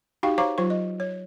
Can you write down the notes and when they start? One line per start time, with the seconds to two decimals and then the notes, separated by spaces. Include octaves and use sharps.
0.23 D#4 F#4 G4 F5 G5 C#6
0.38 C5 C#5 F5 A#5 C#6 D6
0.58 F#3 F4 C5 C#6
0.70 D#5
1.00 C#5